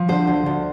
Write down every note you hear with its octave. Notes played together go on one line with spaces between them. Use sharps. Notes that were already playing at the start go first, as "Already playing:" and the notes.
Already playing: F3
D3 C5
D2
D2